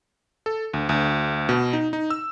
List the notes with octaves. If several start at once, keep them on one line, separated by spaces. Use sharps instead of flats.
A4
D2
D2
B2
D#4
D#4
E6